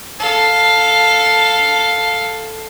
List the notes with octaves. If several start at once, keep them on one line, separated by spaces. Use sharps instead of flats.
A4 F5